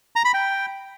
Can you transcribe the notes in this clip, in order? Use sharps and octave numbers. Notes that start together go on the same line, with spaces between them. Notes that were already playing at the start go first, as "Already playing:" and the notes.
A#5
B5
G5